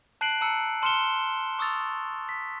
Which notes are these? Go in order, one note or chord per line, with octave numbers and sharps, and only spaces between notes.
A5 F#6 C7 D7 F#7
A5 A#5 E6 C#7
A5 C6 F6 C#7 E7 G7
C#6 D#6 E6 A6 F7
B6